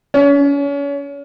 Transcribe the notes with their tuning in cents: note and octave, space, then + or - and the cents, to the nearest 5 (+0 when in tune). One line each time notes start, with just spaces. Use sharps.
C#4 +35